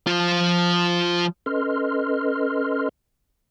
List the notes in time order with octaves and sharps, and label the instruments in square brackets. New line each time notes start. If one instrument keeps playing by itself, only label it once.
[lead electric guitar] F3 F4
[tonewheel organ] C#4 A4 B4 D#5 C6 F6